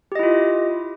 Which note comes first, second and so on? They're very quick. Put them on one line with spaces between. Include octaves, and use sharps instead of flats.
G4 D#5 E4 F4